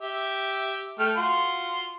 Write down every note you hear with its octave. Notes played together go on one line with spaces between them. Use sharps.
G4 E5
A3 G5 F6
F4 F#4 C6